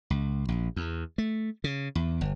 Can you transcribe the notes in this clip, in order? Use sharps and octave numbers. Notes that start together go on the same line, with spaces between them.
C#2
A#1
E2
A3
C#3
E2
G1